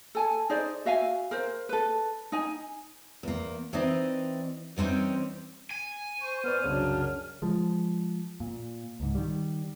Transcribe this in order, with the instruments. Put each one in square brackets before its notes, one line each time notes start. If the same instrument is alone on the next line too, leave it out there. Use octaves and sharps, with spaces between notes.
[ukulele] A4 G#5 A5
D#4 G#4 C5 D5
F#4 E5 F5 G#5
A#4 C5
A4 B4
D#4 G#5
[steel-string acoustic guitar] E2 A#3
E3 C4 D#4 D5 D#5
E3 G3 C4 C#4 D#4
[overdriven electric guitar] G#5
[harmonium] C5 [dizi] C#6
[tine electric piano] B3 B4 D5 [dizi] F6
[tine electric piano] C2 C#3 C#5 [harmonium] F#2 F#3 D4
[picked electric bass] F3 G#3
A#2
C#2 G#2
D#3 G3